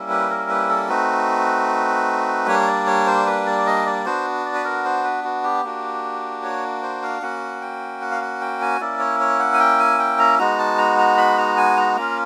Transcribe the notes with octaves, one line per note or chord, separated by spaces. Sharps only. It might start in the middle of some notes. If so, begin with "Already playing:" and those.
Already playing: G3 A#3 C#4 E4
B4
A#4
B4
A4
A3 C4 D#4 F#4 B4
G3 A#3 D4 C#5
D5
C#5
C5
B4
D5
D#5
D5
B3 D4 F#4 C5
D5
B4
A#4
C5
B4
F#4
G4
A#3 D4 F#4
C#5
C5
F5
A#3 C#4 F#4 F#5
G5
F#5
F5
F#5
G5
G#5
A#3 C#4 E4 D5
C#5
C#5
F#5
G#5
G5
G#5
G5
A#5
G#3 B3 D#4 F#4 A#5
A5
A#5
A#5
B5
A#5
G#5
A#5
A#3 C#4 F4 A#5